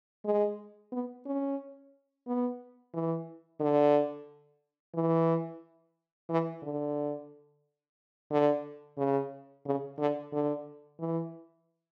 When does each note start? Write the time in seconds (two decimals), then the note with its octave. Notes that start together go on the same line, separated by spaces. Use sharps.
0.25 G#3
0.92 B3
1.25 C#4
2.27 B3
2.94 E3
3.60 D3
4.95 E3
6.29 E3
6.63 D3
8.31 D3
8.98 C#3
9.65 C#3
9.98 D3
10.32 D3
11.00 E3